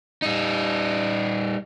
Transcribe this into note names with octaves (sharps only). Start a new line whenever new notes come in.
G3 D#4